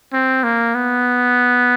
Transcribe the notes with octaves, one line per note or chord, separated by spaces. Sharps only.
C4
A#3
B3